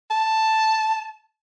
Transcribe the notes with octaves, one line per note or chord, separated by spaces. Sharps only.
A5